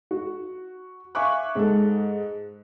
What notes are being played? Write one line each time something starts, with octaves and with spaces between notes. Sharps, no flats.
F#4
E5 F5 G#5 C#6 D6 F#6
G#2 A4